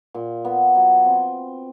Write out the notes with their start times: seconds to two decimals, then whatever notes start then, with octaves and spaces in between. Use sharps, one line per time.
0.14 A#2
0.45 B3
0.75 F#3
1.05 C4